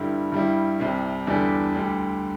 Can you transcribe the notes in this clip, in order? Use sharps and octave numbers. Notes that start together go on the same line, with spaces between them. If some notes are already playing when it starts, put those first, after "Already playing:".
Already playing: G2 D3 G3 E4
G2 G3 E4
C2 C3 G3
E2 D3 G3 D4
D2 D3 G3